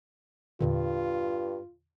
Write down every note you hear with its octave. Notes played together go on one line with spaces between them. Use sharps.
E2 G2 A#2 D3 F4